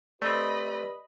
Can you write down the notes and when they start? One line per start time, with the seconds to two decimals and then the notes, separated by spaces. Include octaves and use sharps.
0.22 A3 C4 G4 B4 D5 D#5 B5